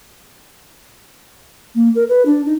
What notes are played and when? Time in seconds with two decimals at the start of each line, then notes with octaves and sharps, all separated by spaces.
1.75 A#3
1.95 A#4
2.09 B4
2.26 D4
2.46 D#4